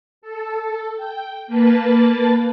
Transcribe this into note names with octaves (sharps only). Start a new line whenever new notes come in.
A4
G5
A#3 B4 A5 A6